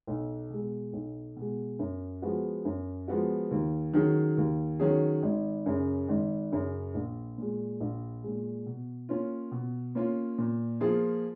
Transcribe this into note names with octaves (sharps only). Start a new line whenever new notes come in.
B1
B2 G#3
B1
B2 G#3
F#2
F3 G#3 B3 F#4
F#2
F3 G#3 B3 F#4
D#2
D#3 F#3 C#4 G#4
D#2
D#3 F#3 C#4 G#4
G#1
F#2 C#3
G#1
F#2 C#3
A#1
A#2 G#3
A#1
A#2 G#3
B2
A#3 C#4 F4
B2
A#3 C#4 F4
A#2
F3 A#3 F4 G#4